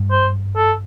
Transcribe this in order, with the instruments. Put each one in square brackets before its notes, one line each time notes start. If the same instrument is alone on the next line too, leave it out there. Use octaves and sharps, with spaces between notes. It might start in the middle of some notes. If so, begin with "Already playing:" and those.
Already playing: [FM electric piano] G2
[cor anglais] C5
A4